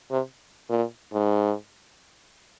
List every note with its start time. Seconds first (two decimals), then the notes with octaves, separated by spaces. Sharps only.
0.11 C3
0.69 A#2
1.13 G#2